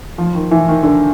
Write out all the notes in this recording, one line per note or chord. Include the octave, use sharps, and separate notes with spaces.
F3
D#3
E3
D#3
D3